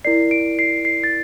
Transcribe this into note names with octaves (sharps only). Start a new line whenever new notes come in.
E4 A#4 D5 C7
D7
C7
C7
A6